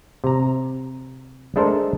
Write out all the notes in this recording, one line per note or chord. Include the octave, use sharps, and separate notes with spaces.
C3 A#5
G#3 A3 D4 A4 A#4 C5